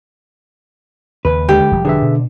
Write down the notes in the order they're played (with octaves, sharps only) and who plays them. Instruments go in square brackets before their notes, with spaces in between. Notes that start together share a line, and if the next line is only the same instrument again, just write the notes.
[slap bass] D#2 C#3 [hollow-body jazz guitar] B4
[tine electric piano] D3 G#3 [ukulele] G4
[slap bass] E1 F3 G3
[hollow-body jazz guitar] D3 [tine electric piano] G#4 B4 E5
[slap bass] B2